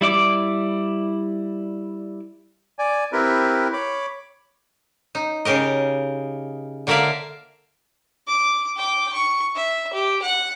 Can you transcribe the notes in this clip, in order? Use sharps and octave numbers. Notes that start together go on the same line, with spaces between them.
G3 E4 D5 D6
D5 G#5
C4 E4 G4 A#4 B4
C#5 B5 D6
D#4
C#3 G4 A#4 D#5
D3 A#3 A#4 D5 E5 F5
D6
G5 D6
C#6
E5
G4
F#5